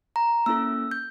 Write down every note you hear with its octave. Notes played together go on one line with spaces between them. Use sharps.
A#5
A#3 C#4 E4 A4 E6
G6